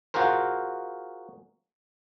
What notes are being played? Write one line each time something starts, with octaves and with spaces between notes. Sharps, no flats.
F4 F#4 G#4 A#4 C5